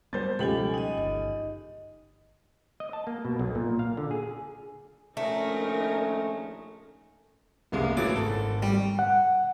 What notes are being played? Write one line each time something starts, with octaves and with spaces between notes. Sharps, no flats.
F#3 G3 B3 C5 G6 A6
C#2 B2 F3 G3 G4 A4 G#5 F#7
D#4 D#5
G1
D#5
A5
A#3
B2
B1
A#2
F5
D3
G#4
A#1 D#3 A3 C#4 D#4 A#4
F#1 C2 G#3 A#3 B3
A2 E3 F#3 G#4 D6 A6
G#1 A4
G3
F#5